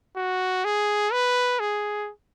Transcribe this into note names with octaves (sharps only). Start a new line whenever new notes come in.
F#4
G#4
B4
G#4